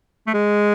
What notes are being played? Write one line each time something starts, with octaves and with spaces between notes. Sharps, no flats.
A3
G#3